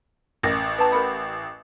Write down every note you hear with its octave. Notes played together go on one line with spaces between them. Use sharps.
A1 A#4 A#6
B4 G5 A5 A#5
G4 A#4 F#5 B5